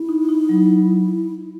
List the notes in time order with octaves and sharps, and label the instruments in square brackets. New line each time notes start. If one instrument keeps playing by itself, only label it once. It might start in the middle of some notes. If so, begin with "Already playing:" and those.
Already playing: [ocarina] E4
[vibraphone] D#4
D#4
F#3